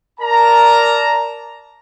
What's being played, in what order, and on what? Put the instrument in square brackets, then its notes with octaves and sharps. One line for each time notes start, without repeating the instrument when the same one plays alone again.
[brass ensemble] A#4 D5 A5 A#5